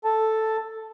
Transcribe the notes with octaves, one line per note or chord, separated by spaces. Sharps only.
A4 A5